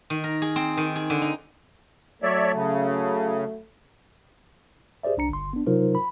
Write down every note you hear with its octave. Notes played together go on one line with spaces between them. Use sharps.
D#3
A#4
G#4
C4
D#3
G#4
D3
D#4
F#3 A3 C#5 D5 E5
C#3
G4 G#4 C5 D5 E5
C2 D4 A#5 C#7
G1 C6
B3 D4
C3 F#3 D#4 F4 A#4 C5
B5